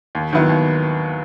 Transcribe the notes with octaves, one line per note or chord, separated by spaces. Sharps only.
D#2
D#3 F#3 B3 E4
D#2